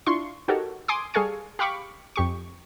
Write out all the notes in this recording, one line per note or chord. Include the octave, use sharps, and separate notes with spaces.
D4 E4 F4 C6 C#6
D#4 F#4 G4 A4 A#4 C#5
G#5 C6 D6 D#6
G3 G#4 A4 F5 G#5 C#6
G4 F5 B5 C#6 D6
F2 G4 C#6